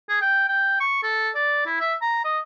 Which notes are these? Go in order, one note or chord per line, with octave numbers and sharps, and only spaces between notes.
G#4
G5
G5
C#6
A4
D5
E4
E5
A#5
D#5